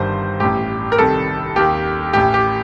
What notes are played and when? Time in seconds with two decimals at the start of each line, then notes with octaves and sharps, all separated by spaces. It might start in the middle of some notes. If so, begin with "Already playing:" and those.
Already playing: G1 G2 D#3 C5
0.40 A1 A2 G4
0.92 A#4
0.98 C2 C3 D#3 A4
1.56 D#2 D#3 G4
2.13 A1 A2 G4
2.34 G4